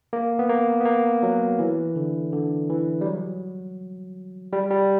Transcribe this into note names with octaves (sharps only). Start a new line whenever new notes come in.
A#3
B3
A#3
B3
A#3
F#3
E3
D3
D3
E3
G3
F#3
G3
G3